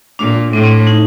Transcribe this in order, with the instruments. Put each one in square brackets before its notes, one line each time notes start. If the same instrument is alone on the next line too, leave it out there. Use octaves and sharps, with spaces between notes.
[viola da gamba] A#2 [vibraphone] D4
[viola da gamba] A2 [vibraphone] C4
[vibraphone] C4
D#4